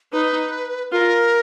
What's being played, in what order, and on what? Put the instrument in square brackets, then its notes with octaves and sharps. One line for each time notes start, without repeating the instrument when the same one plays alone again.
[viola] D#4 [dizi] B4
[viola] F4 [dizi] A#4